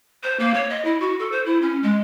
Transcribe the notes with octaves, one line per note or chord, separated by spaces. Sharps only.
C5
A#3
C#5
D#5
E4
F#4
A4
C5
E4
C#4
G#3